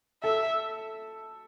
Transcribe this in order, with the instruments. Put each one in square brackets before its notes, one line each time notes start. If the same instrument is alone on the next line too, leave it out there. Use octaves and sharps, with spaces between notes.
[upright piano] A4 [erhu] E5